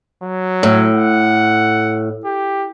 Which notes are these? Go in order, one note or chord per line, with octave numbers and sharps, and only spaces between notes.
F#3
A2
F#5
G4